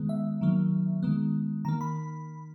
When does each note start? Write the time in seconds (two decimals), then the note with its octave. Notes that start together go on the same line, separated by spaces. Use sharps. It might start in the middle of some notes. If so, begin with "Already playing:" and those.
Already playing: D#3 G#3 B3
0.09 E5
0.41 D#3 F#3 A#3
1.03 D#3 G#3 B3
1.65 D#3 A#3 A#5
1.81 B5